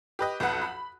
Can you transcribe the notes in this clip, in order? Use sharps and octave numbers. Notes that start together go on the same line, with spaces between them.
G4 B4 D#5
B1 F2 B4 F#5
B5